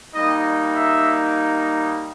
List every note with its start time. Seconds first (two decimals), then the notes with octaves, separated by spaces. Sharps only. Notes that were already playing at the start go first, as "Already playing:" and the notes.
0.15 G3 A#3 D#4 D#5
0.75 E5